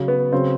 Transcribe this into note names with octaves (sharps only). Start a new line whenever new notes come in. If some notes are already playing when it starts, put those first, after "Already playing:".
Already playing: C#3 F#3
B3
C#3 F#3 C4